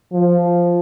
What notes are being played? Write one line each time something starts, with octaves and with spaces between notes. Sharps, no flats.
F3